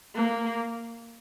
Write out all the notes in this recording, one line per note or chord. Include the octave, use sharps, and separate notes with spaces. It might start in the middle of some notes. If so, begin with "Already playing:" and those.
A#3